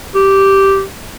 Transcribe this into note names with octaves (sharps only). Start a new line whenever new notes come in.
G4